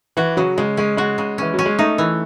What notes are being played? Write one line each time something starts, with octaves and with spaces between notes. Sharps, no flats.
E3 F#4
C#3 F#3
C#3 G#3
G#3 C#4
G#3 F#4
C#3
E3 C#4
F#3 C#4
G#3
A3 D#4
E3